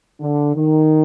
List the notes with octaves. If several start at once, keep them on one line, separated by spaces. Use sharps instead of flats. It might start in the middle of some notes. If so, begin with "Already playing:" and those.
D3
D#3